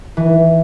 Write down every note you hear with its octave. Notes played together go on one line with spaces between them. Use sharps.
E3